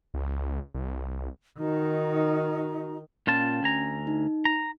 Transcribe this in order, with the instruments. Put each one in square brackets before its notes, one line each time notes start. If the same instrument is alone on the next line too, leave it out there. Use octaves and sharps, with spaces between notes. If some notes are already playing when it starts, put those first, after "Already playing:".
[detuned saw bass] C#2
C2
[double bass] D#3 [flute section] D#4 F#4 A#5
[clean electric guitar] A#2 F4 A5 [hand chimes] C#4
[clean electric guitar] D2 G#5 A#5
[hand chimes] D#4
[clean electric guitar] A#5